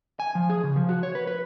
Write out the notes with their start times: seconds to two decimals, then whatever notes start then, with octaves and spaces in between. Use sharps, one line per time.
0.20 G#5
0.35 F3
0.50 G#4
0.64 C#3
0.76 F3
0.89 F#4
1.03 C#5
1.15 B4
1.27 B4